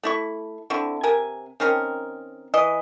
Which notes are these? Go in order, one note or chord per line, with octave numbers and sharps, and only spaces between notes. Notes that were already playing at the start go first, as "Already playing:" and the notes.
A3 E4 C#6
D3 C4 E4 C#6
C3 A#4 G#5
D#3 C4 C#4 A#4
E3 D#5